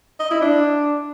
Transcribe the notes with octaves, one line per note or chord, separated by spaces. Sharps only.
D#5
E4
D4